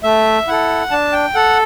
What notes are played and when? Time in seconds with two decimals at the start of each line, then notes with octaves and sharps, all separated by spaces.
0.03 A3 E5
0.47 E4 A4 F#5
0.91 D4 A5
1.13 G5
1.35 A4 F#5